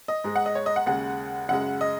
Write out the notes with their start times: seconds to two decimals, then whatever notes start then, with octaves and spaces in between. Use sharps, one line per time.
0.08 D#5
0.24 G#2 G#3
0.36 F#5
0.46 D#5
0.55 C#5
0.66 D#5
0.76 F#5
0.86 D#2 C#3 G#3 F#5
1.49 F#2 C#3 G#3 F#5
1.81 D#5